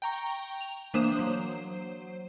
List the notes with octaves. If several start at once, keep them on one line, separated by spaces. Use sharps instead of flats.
G5 A#5 C#6
F7
E3 A#3 D4 C5 D#6 E7
F#3 C5